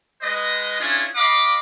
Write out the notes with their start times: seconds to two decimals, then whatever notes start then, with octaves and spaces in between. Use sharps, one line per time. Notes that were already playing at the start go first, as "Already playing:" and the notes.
0.22 G#3 B4 D#5
0.80 C#4 D4 E4 F4 G#4
1.16 D#5 F5 B5 D6